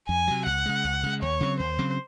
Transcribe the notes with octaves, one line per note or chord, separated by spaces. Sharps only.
F2 G#5
C3 F#3
C#2 F#5
C#3 G#3
C#2
C#3 G#3
D#2 C#5
C#3 F#3 C4
D#2 C5
C#3 F#3 C4